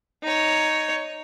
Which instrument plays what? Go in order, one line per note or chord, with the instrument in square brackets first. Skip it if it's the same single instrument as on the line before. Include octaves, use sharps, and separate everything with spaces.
[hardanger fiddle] D#4 C#5